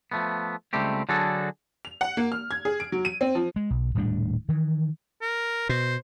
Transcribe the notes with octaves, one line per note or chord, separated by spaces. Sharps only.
F3 A3 B3
C#2 G3 A3 C4 G4
D3 F#3 D4 F#4 G#4 A4
F7
F#5
A#3
F6
G#6
G#4
D7
F#3
D#7
C4
F3
G#3
B1
D#1 A2 G3 D4
D#3 E3
A#4
B2 C5